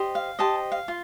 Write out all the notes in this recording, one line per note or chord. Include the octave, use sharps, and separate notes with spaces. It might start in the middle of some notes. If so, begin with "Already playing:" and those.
Already playing: G4 C5 D#5
F5
G4 C5 D#5 A5
F5
F4